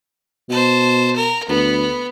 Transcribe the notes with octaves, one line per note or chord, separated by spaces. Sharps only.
B2 C5 A5
A#4
D2 B3